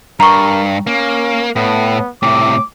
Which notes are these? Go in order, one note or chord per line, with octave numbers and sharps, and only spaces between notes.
G2 A#4 A#5 C#6
A#3 C#4
A2 B3
A2 C3 D6